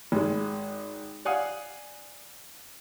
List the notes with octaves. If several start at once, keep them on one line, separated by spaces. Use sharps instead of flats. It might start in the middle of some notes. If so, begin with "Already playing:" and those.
G#1 G#3
D5 F5 F#5 G#5 D#6